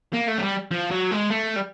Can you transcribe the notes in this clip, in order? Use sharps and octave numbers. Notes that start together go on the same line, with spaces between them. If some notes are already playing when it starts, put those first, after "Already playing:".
A#3
A3
F#3
G3
F3
F#3
G#3
A3
G3